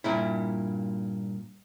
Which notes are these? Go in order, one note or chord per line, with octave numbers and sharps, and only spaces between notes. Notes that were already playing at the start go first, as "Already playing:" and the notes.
G2 A#2 E4